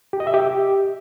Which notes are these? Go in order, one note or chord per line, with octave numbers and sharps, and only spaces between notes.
G4
D#5
E5
G4